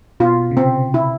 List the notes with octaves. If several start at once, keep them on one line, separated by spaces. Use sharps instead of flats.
B2 F4
C#3
C3 C4
E4